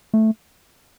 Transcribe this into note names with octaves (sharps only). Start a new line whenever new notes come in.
A3